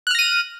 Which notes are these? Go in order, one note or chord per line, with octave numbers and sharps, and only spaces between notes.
F6 F#6 A#6 D#7